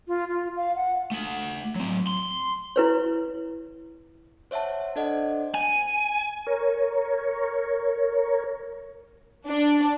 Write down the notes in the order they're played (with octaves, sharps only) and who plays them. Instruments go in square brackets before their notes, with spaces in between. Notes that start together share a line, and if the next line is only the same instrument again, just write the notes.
[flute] F4
F4
F5
F#5
[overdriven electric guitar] A3 F#5
F#3 C4
C6
[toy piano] E4 B4 C#5
[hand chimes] C5 C#5 E5 F#5 A5
D4 A4 C5 D5 D#5 F#5
[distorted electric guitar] G#5
[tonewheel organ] A#4 C#5
[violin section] D4